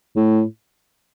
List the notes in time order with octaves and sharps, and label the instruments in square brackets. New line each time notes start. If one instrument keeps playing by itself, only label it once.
[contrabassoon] A2